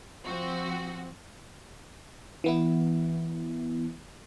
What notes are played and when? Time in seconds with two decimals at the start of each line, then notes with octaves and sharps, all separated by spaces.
0.25 F3 C4 F#4
2.44 E3 B3 E4